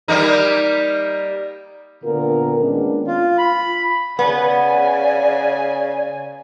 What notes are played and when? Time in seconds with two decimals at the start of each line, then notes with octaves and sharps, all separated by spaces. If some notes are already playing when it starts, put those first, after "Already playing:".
0.08 G3 A#3 D#4
2.03 A#2 D3 B3 F4 A#4
2.59 D#3 G#3 A#3 B3 C#4 D4
3.07 F4
3.38 B5
4.19 C#3 B3 D5 G#5